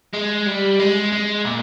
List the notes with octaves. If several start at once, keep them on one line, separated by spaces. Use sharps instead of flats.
G#3
G3
G#3
G#3
A#2